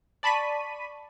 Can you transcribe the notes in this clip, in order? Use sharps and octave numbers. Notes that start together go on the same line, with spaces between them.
D5 A5 B5 C#6 B6 D#7